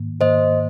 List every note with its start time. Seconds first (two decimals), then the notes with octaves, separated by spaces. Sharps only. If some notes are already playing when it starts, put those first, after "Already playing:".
Already playing: G#2 D#3 A#3
0.21 G#2 D#3 A#3 C5 D#5